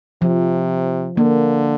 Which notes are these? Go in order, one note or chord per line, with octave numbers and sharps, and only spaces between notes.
C3 F3
D3 A#3